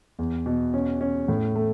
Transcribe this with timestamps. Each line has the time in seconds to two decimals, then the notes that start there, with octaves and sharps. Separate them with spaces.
0.19 E2
0.46 B2
0.74 C#4
1.01 C#4
1.28 A2
1.56 A3